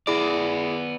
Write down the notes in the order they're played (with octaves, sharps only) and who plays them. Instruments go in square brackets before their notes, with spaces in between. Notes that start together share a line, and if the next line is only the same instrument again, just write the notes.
[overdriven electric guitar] B3 D5 [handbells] E4 G#4 D6